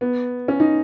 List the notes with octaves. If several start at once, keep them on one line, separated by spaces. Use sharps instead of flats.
B3
C#4
D#4